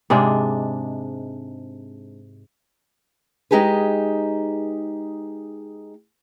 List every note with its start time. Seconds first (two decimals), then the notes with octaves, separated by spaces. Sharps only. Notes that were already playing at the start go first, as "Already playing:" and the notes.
0.10 G#2 C3 G#3 D4
3.51 G#3 D#4 G4 G#4 B4